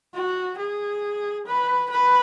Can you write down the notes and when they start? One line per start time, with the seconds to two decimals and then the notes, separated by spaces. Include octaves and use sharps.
0.14 F#4
0.58 G#4
1.46 B4
1.90 B4